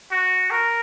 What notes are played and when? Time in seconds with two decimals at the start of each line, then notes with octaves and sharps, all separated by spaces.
0.12 F#4
0.51 A#4